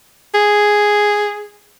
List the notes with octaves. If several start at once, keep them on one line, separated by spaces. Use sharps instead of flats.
G#4